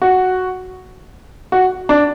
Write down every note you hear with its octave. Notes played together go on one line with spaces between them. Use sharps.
F#4
F#4
D4